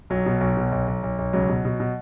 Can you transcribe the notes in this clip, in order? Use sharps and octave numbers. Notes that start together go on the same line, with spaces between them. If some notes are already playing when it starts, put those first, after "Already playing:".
B1 F#3
B2
B1
B2
B1
B1
B1
B1
C#2 F#3
B2
B2
B2